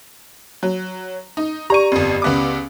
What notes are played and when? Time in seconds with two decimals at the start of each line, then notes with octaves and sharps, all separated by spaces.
0.63 F#3
1.37 D#4
1.70 G4 D5 A#5 C#6 D#7
1.92 G1 F2
2.22 C#2 B3 D6